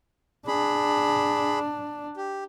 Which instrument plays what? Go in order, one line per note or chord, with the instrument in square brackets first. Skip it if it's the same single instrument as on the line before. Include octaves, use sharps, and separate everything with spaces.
[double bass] D4 [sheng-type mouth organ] G#4 B5
[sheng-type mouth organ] G4